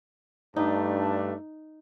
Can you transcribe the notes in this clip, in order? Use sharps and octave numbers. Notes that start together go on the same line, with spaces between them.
G2 A3 D4 D#4